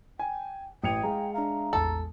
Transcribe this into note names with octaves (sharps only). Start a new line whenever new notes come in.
G5 G#5
A1 G5 D#6 G#6 C#7 D#7 F7
G#3 F5 G#5 A#5
D4 E5 F5 A#5
A1 E2 A4